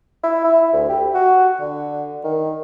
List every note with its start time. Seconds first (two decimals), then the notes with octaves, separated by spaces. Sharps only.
0.23 E4
0.44 E4
0.73 D2
0.89 G4
1.14 F#4
1.60 D3
2.24 D#3